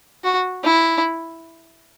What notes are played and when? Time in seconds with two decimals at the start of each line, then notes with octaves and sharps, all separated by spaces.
0.24 F#4
0.64 E4